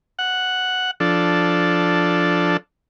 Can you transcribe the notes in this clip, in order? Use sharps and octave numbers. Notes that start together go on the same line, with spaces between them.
F#5
F3 D4 A4